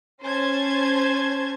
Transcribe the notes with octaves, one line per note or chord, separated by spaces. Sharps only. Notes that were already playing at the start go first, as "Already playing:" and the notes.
C#4 C5 A5 G#6